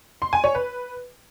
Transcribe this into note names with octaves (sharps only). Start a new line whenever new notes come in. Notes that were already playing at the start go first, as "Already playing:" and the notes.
C6
G#5
C#5
B4